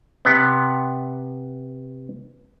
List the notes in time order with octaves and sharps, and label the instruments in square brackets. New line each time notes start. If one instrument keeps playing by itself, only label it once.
[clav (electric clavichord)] C3 B3